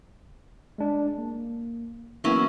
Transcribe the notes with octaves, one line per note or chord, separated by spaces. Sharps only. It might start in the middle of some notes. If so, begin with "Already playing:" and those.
G#3 D4
A#3
E3 F#3 A#3 B3 C#4 E4